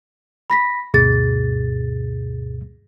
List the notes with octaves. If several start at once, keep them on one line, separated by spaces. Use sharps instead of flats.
B5 A#6 B6
D2 G2 B2 G#4 A6